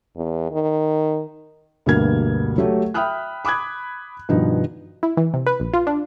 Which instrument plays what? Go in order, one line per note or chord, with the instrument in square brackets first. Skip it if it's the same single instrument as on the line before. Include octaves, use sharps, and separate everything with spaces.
[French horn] E2
D#3
[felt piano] D2 G2 B2 A#3 F6 G#6
F#3 A3 G4 A4
E5 G5 B5 D#6 F6 F#6
B5 D6 D#6 F#6 G#6
G2 B2 D#3 F3 D#4
[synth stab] E4
E3
C3
B4
A#1
F4
D4